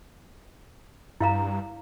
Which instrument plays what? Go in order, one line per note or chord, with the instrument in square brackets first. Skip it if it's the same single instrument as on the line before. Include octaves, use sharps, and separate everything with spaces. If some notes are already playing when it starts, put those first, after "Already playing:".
[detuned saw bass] G2 [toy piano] E4 F5 A#5